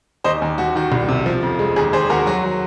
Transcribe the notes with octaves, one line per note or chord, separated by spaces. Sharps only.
D#2 C5 D#5
D#2
D#2 F#4
D#3 F#4
C2
C3
F3
F2
G#3
D#2 G#4
D#2 G#4 C5
D#2 F#4 A#4
F#3 F#4
F#3